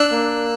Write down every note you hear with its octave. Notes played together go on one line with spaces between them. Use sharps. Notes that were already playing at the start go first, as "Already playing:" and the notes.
Already playing: D4 E6 F#6
A#3